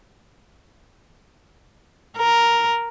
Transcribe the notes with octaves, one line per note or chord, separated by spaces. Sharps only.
A#4